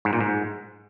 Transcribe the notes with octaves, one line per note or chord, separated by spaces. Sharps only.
G#2
A#2
G#2